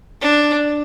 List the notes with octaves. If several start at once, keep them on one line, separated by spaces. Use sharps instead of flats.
D4